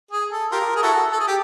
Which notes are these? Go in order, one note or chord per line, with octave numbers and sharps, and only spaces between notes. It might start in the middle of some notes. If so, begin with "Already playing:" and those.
G#4
A4
F4 G4 A#4
G#4
E4 F#4 A4
A4
G#4
G4